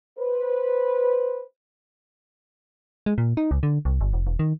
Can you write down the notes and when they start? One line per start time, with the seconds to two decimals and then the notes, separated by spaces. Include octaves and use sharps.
0.19 B4 C5
3.06 G#3
3.18 A#2
3.37 D#4
3.51 C#2
3.63 D3
3.85 C2
4.01 G1
4.13 F1
4.27 E1
4.39 D#3